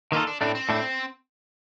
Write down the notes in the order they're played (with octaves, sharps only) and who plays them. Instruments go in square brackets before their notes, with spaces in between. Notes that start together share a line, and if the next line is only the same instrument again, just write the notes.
[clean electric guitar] D#3 A#3 F4 A4 [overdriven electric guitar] D#4
[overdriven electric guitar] D4
[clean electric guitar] A2 A3 D4 [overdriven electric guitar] C4
[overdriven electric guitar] C4
[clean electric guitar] A2 A3 D4